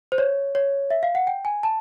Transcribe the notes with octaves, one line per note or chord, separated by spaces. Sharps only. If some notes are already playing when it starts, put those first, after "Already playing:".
C5
C#5
C#5
E5
F5
F#5
G5
G#5
A5